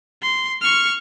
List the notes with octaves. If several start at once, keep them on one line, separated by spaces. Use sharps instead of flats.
C6
C#6 F6